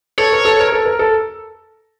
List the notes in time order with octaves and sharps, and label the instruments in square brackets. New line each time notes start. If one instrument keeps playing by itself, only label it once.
[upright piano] A4 [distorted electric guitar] C#5
[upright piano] A#4
A4
A#4
A4
A#4
A4